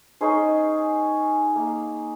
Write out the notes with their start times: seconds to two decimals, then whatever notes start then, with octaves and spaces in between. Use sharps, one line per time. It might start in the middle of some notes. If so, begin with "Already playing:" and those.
0.21 C#4 D#4 G#4 C5
1.56 A#3